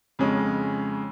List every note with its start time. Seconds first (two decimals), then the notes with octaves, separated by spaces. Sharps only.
0.19 F2 C#3 G#3 C#4